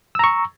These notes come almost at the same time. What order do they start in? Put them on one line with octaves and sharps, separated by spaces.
E6 A#5 C#6